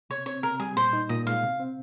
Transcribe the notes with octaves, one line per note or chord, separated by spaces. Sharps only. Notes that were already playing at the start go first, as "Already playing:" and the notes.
C3 C#5
C4 C#5
C3 A#4
G3 G#4
A#2 C5
D#4
A#2 D#5
G#3 F5
C3
C4